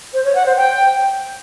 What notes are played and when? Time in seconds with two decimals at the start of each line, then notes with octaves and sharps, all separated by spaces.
0.14 C5
0.24 C#5
0.35 F#5
0.46 C5
0.56 G5